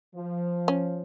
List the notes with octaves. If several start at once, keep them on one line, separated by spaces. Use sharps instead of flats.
F3
C#4